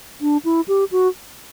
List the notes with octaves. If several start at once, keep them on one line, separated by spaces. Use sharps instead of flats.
D4
E4
G4
F#4